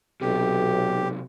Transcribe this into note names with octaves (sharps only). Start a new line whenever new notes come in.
B1 C3 F#3 G4